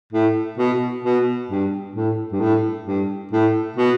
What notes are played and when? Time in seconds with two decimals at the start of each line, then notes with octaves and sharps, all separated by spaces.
0.13 A2
0.58 B2
1.04 B2
1.50 G2
1.95 A2
2.32 G2
2.40 A2
2.86 G2
3.32 A2
3.77 B2